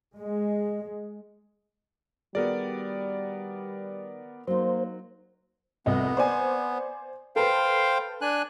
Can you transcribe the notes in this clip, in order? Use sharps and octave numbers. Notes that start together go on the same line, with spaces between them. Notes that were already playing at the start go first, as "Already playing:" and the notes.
G#3
D#3 G3 B3 F#4 G#4 A#4 D5
F#3 A#3 D#4 C5
F1 C2 B3 D#5
C5 D5 G#5
A4 B4 C5 F5 G5
D4 G#5 F#6